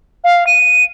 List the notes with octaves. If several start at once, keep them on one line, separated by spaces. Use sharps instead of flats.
F5
D#7